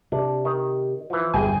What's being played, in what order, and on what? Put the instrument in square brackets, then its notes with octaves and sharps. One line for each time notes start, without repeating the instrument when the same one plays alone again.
[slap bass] C3 [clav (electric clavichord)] D4
[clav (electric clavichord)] D#3
E3 F3
[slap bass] G1 E2 [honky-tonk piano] G#4 G5 G#5